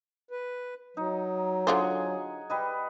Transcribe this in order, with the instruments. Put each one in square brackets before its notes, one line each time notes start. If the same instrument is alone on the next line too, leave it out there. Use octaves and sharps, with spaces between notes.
[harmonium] B4
[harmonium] F#3 [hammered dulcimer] D#4
[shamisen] D3 F4 C5 [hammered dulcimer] G#4 F#5 G#5
[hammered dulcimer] G3 B4 D#5